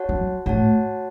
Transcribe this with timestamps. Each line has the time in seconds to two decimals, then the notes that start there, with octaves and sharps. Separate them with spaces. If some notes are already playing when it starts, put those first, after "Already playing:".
Already playing: F#4 C#5 F#5 A5
0.09 F#3
0.46 A2 F#4 C#5 F#5 A5